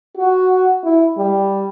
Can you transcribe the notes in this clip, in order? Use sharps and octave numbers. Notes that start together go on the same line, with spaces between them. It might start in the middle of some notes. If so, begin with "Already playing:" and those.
F#4
E4
G3